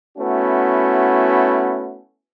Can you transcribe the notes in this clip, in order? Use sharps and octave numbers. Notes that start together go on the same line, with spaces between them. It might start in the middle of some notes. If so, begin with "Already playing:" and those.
A3 B3 C#4 E4 F#4